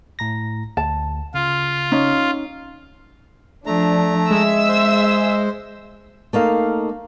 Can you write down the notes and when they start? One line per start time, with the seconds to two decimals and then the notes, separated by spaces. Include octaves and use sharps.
0.19 A2 A#5 A#6
0.77 D2 A5
1.34 C#3 F4
1.92 C#4 D#4
3.66 F3 A3 D4 A#5
4.31 G#3 E5 E6
4.69 C5
6.33 A3 A#3 D#4 F5